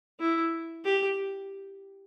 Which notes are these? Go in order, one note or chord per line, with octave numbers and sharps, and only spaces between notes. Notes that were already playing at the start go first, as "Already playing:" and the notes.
E4
G4